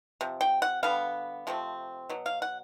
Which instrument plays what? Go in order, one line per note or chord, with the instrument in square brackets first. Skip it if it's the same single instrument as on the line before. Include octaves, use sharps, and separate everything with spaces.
[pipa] C3 F3
G5
F#5
D3 G3 B3 F5
C3 F3 A3 C4
B2 F#3
F5
F#5